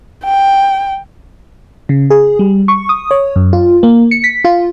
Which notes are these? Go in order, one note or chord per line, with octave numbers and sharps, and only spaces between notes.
G5
C#3
G#4
G3
C#6
D#6
C#5
F#2
F4
A#3
C#7
B6
F4